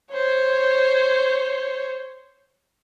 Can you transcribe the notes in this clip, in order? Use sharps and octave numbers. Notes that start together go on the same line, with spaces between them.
C5 C#5